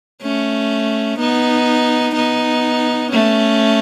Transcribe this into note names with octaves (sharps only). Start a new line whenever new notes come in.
A3 C#4
B3 D#4
B3 D#4
A3 C#4